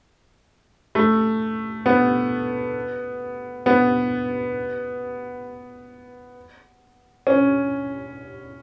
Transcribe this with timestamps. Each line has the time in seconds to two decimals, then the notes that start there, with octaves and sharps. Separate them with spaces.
0.95 A3
1.86 B3
3.66 B3
7.27 C#4